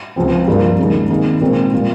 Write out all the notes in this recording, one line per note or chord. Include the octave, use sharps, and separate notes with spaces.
C#2 C3 F3 C4
G2 F3 A#3 F4 A#4
D#2 C#3 G#3 D#4
C3 D#3 A#3 D#4 G#4
A#2 G#3 C4 D#4 A#4
A#2 G3 A#3 F4